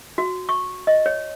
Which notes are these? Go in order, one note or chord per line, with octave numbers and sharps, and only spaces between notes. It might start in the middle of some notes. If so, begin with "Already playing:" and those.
F#4
C#6
D#5
C#5